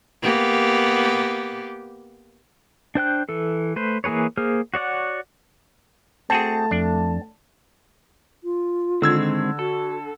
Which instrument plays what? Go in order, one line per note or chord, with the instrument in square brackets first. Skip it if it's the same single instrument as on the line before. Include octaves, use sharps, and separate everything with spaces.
[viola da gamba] A#3 B3 G4
[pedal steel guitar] D4 C5 G5 F#6
E3 A4
A3 B4 C5
E3 A#3 G#4 B4 C#5
A#3 G#4 C5 F6
F#4 C#5 D5 F#5
[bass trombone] A3 [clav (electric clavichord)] C4 F#4 G#4 [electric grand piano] A5
[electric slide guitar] F2 [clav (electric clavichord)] D4
[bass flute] F4
[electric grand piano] D3 E6 G#6 [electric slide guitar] D#3 G#3 C4
[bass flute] F#4 [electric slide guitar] A4